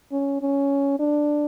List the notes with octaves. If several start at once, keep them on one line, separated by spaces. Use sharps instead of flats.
C#4
C#4
D4